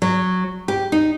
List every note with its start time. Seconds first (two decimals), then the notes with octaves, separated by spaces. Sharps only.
0.02 F#3
0.68 G4
0.92 D#4